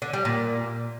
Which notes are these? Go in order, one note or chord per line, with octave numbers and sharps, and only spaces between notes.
D3
G3
A#2